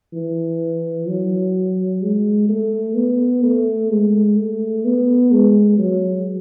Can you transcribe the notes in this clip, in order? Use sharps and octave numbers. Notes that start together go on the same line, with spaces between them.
E3
F#3
G#3
A3
B3
A3
G#3
A3
B3
G#3
F#3